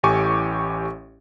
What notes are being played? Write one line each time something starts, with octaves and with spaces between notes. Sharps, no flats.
A1 A2 G4 G#5 C#6 D6